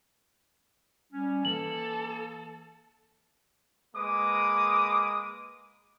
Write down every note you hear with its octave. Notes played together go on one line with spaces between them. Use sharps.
G3 C#4
E3 A#3 A4 F#7
G#3 A#3 B4 D6 D#6